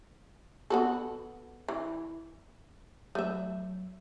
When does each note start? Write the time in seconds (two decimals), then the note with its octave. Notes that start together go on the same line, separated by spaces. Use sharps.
0.70 B3 F#4 A4
1.68 E3
3.15 F#3 A3 E5